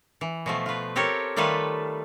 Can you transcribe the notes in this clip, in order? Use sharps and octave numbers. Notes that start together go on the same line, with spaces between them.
E3
B2 F3 A3
F4 B4
C4 G4 A4 A#4 C#5
D#3 G3 A3 F4 A4 B4